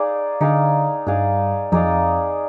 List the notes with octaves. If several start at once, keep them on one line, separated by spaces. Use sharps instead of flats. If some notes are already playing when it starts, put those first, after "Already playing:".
Already playing: D#4 G#4 D5 F5
D3 D#4 G#4 D5 F5
G2 D#4 G#4 D5 F5
F2 D#4 G#4 D5 F5